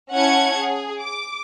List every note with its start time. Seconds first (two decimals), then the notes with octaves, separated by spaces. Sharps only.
0.14 C#4 E4 F#5 A5 G#6 C#7
0.57 G#4
1.00 D6